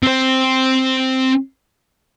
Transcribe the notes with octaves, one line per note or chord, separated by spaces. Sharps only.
C4 C5